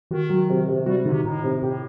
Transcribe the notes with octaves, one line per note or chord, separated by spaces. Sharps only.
D#3 F#4
F#3
C3
C3
G3 F#4
D3 D#3
C3
A2 D#4
C3
A2 G4